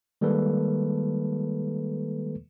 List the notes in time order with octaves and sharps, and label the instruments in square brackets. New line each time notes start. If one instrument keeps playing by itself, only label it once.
[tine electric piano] D#3 G3 G#3 A#3 A4 B4